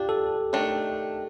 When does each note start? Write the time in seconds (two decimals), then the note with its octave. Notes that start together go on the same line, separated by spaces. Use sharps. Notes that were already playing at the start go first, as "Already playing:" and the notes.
Already playing: D4 F4 G4
0.09 A4
0.53 D#3 A3 D4